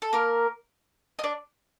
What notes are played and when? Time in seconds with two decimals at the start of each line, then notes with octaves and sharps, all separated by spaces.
0.02 A4
0.13 A#3 A#4
1.19 D#5
1.24 D4 D5